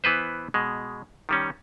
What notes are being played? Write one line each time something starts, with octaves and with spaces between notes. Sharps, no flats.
E3 B3 B4 C5
B2 G#3
D#3 G3 C#4